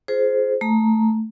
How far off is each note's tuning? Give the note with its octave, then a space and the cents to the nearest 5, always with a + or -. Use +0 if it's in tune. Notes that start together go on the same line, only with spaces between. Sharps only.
F4 +0 G#4 +25 C5 -5
A3 +0 A#5 +0